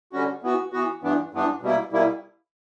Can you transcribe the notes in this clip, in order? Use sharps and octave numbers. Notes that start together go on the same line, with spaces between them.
D3 G3 C#4 F#4
E3 B3 F#4
E3 B3 F#4
G2 E3 B3 D4
G2 E3 B3 D4
B2 G3 A#3 E4
B2 G3 A#3 E4